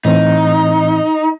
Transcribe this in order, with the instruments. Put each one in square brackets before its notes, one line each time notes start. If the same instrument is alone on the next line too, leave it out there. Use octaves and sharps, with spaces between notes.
[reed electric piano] A2 E3 C4 [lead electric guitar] D#4